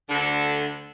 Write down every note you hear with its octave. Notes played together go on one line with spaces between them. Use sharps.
D2 D3